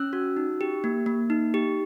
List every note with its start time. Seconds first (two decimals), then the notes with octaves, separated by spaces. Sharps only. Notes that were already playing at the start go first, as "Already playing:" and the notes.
Already playing: C#4 E6 F#6
0.13 F#4
0.37 D#4
0.61 G4
0.84 A#3
1.06 A#3
1.30 D#4
1.54 G4